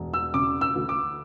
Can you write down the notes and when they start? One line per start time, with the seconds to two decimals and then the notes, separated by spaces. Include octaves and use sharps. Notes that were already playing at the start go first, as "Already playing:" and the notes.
Already playing: E1
0.14 E6
0.34 C#3 D6
0.61 E6
0.75 D2
0.89 D6